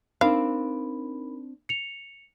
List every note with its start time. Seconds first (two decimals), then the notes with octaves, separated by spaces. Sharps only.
0.21 C4 D4 D#4 A#4 F5 B5
1.69 C#7 F7